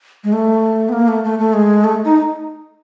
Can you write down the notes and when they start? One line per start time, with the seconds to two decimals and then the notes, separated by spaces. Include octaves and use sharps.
0.24 G#3
0.33 A3
0.89 B3
0.93 A#3
1.08 A3
1.24 A3
1.39 A3
1.54 G#3
1.84 A3
2.05 D#4